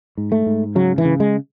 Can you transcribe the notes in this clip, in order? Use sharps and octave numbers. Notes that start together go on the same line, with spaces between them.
G#2
A3
G#2
C#3 F#3
E3
C#3
G#3